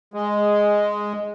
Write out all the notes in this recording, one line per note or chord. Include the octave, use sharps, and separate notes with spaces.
G#3